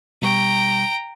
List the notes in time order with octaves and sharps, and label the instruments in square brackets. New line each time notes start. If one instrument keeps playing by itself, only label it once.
[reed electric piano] B2 G3 C#6 [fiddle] G5 A#5